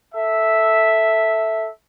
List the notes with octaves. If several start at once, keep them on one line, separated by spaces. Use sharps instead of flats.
A4 E5